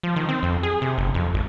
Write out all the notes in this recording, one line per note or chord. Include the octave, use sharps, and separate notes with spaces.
F3
D#3
C4
F2
G#4
C3
F#1
F2
G#1